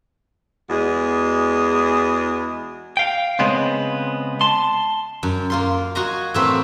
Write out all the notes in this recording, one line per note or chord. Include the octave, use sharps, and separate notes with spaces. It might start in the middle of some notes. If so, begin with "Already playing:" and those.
E2 G#3 F#4 G#4
F5 G5
C#3 G#3 B3 C4
A5 C6
F#2
A#3 F4 C6
F#4 D#5 G#5 A#5 C6
A2 E3 A#3 C4 B5 C6